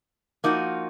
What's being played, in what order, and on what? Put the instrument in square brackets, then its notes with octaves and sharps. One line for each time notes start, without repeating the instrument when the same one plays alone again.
[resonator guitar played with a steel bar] F3 A#3 D#4 F#4